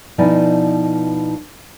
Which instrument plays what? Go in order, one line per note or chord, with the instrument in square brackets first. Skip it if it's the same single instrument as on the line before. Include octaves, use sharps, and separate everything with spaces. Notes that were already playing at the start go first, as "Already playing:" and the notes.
[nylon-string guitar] B2 F3 D#4 E4 D5 G#5